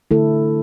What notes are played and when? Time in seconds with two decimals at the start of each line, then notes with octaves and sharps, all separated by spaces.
0.11 D3 A3 E4 A4